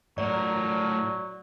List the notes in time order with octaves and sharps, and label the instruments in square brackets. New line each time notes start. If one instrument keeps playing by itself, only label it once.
[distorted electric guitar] A2 A#4 [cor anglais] F#3 [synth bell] D5